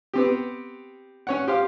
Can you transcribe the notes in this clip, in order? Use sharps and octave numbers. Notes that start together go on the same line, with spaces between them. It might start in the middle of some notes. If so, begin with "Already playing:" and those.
B3 C4 G4
C#4 C#5 F#5
G4 C5 F5